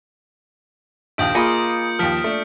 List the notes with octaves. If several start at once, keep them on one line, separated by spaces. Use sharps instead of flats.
A#1 D#2 F4 D#6 G6 D7
A#3 F4 G#4 D#5 B5 D#6 C#7
D#2 F3 F6 B6 D7
A3 D4